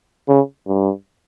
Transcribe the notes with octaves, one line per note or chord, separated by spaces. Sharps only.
C#3
G2